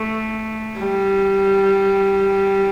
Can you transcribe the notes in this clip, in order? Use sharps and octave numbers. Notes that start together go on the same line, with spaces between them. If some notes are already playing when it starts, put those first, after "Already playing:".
Already playing: A3
G3